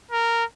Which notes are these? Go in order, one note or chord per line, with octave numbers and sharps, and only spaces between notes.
A#4